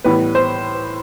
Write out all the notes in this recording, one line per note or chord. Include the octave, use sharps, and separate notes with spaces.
A2 E3 G3 B3 B4
C5